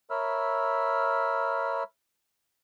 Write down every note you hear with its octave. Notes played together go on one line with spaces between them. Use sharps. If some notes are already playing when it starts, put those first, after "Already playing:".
A#4 C#5 E5 B5 E6 F6